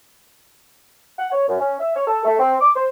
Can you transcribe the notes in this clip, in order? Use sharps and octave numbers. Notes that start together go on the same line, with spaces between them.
F#5
C#5
F#2
C#4
E5
C#5
A4
A3
C4
D6
C5